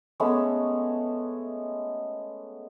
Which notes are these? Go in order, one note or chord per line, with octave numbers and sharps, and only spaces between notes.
G#3 A3 B3 C#4